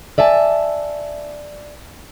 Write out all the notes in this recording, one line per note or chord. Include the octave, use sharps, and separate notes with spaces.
D5 E5 G#5 A5